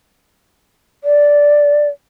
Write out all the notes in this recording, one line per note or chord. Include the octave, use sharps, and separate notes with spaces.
D5